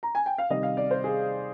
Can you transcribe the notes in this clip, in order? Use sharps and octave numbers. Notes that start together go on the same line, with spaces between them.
A#5
G#5
G5
F5
C3 D#3 G3 D#5
F5
D5
C5
G#4